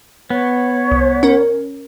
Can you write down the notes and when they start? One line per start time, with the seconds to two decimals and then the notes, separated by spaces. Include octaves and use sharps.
0.30 B3 C#5
0.92 C2
1.23 C#4 A#4